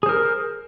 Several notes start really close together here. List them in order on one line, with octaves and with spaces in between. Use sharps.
G#4 C5 A#4